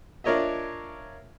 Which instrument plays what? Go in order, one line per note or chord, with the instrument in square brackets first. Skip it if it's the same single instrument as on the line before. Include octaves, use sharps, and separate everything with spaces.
[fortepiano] D4 F4 A#4 C#5 D#5 E5